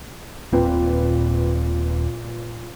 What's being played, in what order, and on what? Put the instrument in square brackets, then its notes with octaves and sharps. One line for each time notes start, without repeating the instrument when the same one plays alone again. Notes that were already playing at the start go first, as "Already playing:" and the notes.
[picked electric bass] D#1 C4 [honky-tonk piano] A#2 B4